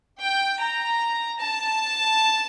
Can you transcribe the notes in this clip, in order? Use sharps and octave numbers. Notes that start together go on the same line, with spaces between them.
G5
A#5
A5